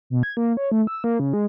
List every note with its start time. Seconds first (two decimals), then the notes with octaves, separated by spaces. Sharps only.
0.10 B2
0.23 G#6
0.37 A#3
0.57 C#5
0.72 A3
0.87 E6
1.04 A#3
1.20 C#3
1.33 G#3